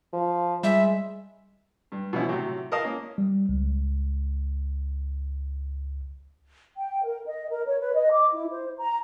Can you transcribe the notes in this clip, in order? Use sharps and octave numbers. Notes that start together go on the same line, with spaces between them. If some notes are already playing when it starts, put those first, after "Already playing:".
F3
G3 G#3 E5
G2
B2 D3 E3 F3 C#4 E4
A2 C3 F#3
A#4 B4 D#5 F5 A5 D#6
A#3 C#4
G3
C#2
G5
A#4
D#5
A#4
C#5
B4
D#5
D6
E4
C5
A#5